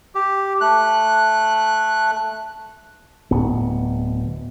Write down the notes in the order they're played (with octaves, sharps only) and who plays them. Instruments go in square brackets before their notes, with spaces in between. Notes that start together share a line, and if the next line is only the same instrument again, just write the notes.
[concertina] G4
A3 F#6
[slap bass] D1 B3